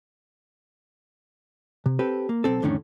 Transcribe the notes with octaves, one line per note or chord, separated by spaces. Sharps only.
C3
C4 G4 A4 B4
A#3
B1 F2 C4 A4
F2 A2 D3 D#3 C#4